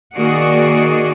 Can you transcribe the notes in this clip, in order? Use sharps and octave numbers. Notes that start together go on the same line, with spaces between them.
D#3 A#3 F#4 G#4 D5 D#5